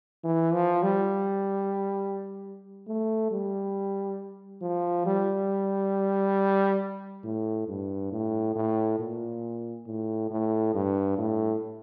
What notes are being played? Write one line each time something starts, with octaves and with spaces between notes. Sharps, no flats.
E3
F3
G3
A3
G3
F3
G3
A2
G2
A2
A2
A#2
A2
A2
G2
A2